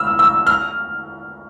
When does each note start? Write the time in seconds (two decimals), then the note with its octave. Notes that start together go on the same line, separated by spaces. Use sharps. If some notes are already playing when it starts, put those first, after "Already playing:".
Already playing: E6 F6
0.19 E6
0.47 F6